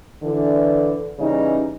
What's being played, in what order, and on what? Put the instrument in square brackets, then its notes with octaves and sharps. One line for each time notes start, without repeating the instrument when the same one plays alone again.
[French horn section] D3 E3
C#3 E3 G3 C#4 D#4